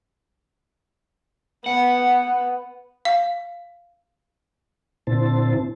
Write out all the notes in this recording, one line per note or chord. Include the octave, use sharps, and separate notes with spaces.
B3 F#5
F5
A#2 D3 C4 E4 C5 A5